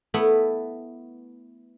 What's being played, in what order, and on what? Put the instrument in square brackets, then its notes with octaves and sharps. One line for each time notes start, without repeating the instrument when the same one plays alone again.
[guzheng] A3 B3 E4